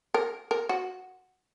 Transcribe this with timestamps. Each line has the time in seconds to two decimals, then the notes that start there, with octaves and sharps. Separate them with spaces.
0.14 A#4
0.51 A#4
0.69 F#4